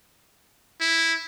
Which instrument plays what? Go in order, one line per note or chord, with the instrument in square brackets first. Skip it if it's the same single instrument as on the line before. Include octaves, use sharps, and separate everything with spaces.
[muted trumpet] E4